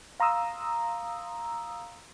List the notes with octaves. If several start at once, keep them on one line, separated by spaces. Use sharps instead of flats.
F5 A#5 C6 D#6 E6